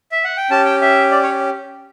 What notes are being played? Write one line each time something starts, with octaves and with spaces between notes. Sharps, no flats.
E5
F#5
G5
C#4 G4 A5
G5
E5
D5
C#5